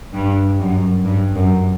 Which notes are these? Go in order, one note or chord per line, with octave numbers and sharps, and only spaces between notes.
G2
F#2
G2
F#2